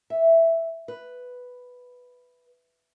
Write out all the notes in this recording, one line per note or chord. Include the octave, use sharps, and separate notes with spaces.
E5
B4